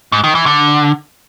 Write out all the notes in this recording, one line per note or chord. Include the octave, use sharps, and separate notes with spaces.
G#2
D#3
E3
D3